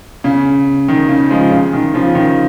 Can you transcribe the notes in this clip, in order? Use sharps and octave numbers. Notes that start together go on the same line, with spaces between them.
C#3
D#3
C#3
F3 G#3
C#3
D#3
C#3 F3
D#3